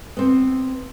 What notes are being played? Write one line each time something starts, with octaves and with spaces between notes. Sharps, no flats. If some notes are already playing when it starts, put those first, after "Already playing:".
B3 C4